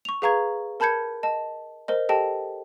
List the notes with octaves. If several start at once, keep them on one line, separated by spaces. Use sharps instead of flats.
C#6 F7
G#4 B4 F5 A#5 C#6 G#6
A#4 A5 B5 G6 G#6 C#7
D#5 A5
A#4 C5 D#5
G4 A4 D#5 G5 A5